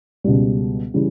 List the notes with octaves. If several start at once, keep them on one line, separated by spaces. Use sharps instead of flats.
C#2 B2 G3
C#3 E3 G3